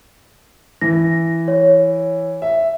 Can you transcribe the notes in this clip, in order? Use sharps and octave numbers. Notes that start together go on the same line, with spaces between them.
E3 A#6
C#5
E5